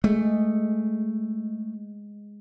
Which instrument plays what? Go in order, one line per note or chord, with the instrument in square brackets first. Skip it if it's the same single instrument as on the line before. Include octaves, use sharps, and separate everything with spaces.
[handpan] G#3 [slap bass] A3